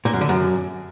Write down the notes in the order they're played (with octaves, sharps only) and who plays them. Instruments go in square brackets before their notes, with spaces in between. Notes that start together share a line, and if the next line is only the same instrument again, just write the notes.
[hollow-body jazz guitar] A#2
F#2
D3
F#2